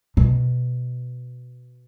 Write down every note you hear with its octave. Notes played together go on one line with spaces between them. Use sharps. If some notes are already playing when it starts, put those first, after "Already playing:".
B2